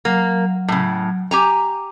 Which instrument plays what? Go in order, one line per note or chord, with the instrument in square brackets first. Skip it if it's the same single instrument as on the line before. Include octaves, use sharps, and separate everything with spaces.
[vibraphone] F#3 [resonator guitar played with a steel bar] A#3
[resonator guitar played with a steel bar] A2 C#3
G4 G#5 A#5